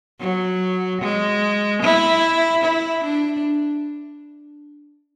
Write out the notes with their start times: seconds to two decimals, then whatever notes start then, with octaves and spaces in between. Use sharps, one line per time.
0.20 F#3
1.01 G#3
1.82 E4
2.63 E4
3.04 D4